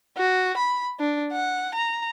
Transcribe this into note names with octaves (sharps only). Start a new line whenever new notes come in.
F#4
B5
D4
F#5
A#5